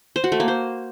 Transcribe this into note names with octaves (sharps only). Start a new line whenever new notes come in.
C5
F#4
A3
A#3
C5